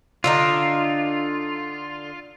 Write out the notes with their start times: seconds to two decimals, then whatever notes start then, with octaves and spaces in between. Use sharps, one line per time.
0.24 D3 D4 D#4 F4